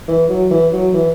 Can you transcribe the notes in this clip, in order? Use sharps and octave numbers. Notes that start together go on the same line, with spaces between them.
E3
F#3
E3
F#3
E3